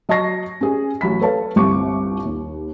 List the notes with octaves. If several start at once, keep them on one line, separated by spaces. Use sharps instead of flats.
F#3 D#5 A5 C#6 A#6 C7
C#4 G#4
A1 F#3 B5 B6
A4 B4 C#5 F5 A5
G1 C2 G2 C4 C#6 D6
D#2